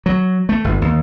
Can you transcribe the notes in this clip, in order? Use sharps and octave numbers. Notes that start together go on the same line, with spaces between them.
F#3
A3
G1
D#2